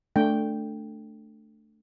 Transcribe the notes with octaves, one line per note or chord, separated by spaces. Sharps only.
A3 D4 G5